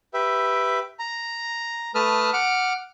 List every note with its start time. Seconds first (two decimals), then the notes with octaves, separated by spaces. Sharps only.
0.14 G4 B4 E5
0.99 A#5
1.95 A3 B4 A5 D#6 F6
2.33 F#5 D6 F6